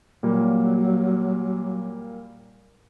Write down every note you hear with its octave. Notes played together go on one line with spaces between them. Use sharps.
A#2 F#3 G3 A#3